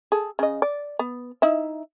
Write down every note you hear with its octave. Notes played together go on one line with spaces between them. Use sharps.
G#4 A4
C#3 D#5
D5
B3
D#4 E4 E5